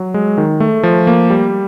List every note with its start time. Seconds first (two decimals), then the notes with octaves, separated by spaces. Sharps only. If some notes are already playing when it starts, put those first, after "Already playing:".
Already playing: F#3
0.14 G#3
0.38 D#3
0.60 A3
0.83 F3
1.07 A#3
1.30 G3